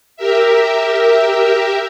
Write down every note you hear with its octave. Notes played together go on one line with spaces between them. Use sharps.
G4 A#4 E5